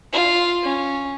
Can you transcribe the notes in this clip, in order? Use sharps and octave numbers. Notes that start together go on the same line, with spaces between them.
F4
C#4